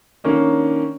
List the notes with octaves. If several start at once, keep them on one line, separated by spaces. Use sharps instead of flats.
D#3 A#3 C#4 D4